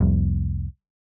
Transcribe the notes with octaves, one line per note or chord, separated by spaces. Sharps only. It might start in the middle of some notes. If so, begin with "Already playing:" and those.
F1 C2